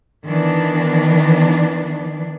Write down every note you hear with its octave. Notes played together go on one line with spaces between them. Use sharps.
D#3 E3 B3 D4